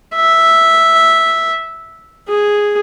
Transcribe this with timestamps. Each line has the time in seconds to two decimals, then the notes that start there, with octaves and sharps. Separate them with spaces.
0.15 E5
2.29 G#4